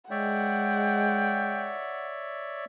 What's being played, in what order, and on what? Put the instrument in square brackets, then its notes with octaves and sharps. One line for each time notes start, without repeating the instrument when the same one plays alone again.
[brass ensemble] G#3 [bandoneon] C#5 D5 E5 [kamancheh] F#5 [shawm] G5